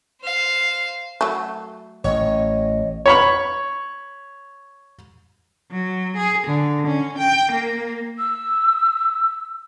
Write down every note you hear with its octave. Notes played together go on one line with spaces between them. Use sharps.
C5 F5
F#3 A3
A1 C#5 D#5
C#5 B5 C#6
F#3
G#4
D3
C#4
G5
A#3
E6